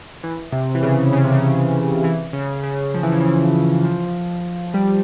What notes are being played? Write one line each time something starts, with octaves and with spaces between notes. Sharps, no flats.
E3
C3
E3
C#3
C#3
C3
C#3
E3
C#3
C#3
F3
E3
C#3
E3
F3
G3